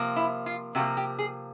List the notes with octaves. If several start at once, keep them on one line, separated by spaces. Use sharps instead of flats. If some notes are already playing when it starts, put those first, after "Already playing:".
Already playing: C3 F3 A#3
E4
F4
C3 F3 A#3 F#4
G4
G#4